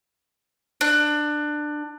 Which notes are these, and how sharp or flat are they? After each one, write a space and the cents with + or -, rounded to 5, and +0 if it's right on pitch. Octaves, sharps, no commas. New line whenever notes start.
D4 +20